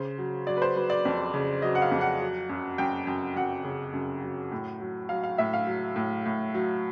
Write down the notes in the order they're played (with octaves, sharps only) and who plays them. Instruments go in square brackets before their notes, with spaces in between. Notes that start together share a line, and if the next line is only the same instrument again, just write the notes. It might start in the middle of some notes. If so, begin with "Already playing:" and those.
Already playing: [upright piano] C#3 C5
F#3
F#3 D5
B4
C5
F#3 B4
D5
F2
C#3
F#3 D#5
F#5
F5
F2
F#5
F#3
F#2
F#2 G5
F#2
F#2 F#5
C#3
F#2
F#3
A2
F#3
F#3 F5
F5
A2 E5
F5
F#3
A2
A2
F#3